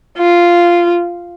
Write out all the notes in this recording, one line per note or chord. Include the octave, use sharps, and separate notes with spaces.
F4